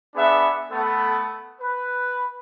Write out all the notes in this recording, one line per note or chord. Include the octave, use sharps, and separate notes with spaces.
B3 D4 G#4 E5
A3 B3 A4
B4